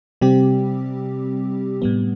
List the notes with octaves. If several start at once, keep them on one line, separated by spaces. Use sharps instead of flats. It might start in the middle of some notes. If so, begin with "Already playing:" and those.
C3 G3 C4 G4
A2 G3 B3